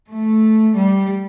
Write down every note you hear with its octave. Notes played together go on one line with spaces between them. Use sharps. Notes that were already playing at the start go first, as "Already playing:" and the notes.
A3
G3